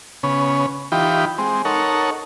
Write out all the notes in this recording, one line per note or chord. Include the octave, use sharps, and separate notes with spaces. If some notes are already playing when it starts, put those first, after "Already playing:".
C#3 B3 C#4
E3 D#4 F4 G4 G5 B5
G#3 C4
D#4 A4 A#4 C#5 F#5